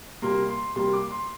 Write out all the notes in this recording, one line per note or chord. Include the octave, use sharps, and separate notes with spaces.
C3 G3 A#3 C6
C6
C3 G3 A#3 C6
D6
C6